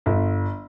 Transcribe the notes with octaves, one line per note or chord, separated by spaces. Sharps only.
G1